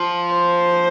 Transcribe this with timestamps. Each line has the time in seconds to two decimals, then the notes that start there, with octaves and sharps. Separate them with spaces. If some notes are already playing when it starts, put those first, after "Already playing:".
Already playing: F3
0.34 C5